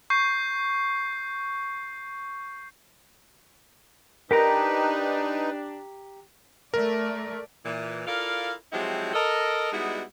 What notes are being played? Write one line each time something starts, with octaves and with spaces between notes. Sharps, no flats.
C#6 G6 C7
D4 D#4 G4 A#4 B4 G5 A#5
A3 A#4 D5
A#2 E3
E4 F4 A4 A#4 D5 F5
F3 F#3 G#3 C4 E4 G4
A4 A#4 D#5
G3 G#3 B3 D#4 E4 F#4